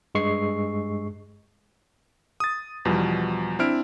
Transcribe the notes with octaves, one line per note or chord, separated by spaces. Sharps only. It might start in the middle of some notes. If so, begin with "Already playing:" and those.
G2 G#3 C#6 C7 C#7
D#6 A6
E2 B2 F3 G3
C4 D4 E4 F6 D7